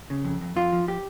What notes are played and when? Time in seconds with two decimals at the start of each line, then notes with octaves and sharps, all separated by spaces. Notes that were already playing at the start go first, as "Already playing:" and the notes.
0.10 C#3
0.25 F2
0.41 F2
0.56 F2 F4
0.73 F3
0.88 G4